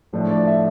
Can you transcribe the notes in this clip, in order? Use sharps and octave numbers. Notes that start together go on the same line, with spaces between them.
A2 F3 A3 D4
D5
E5